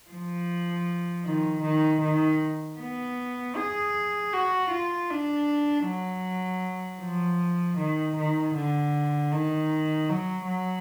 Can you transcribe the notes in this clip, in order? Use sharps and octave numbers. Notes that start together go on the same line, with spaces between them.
F3
D#3
D#3
D#3
B3
G#4
F#4
F4
D4
F#3
F3
D#3
D#3
D3
D#3
F#3
F#3